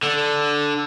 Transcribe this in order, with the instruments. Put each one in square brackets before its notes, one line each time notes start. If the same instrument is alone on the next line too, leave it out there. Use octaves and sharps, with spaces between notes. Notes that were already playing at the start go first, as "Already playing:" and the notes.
[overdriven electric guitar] D3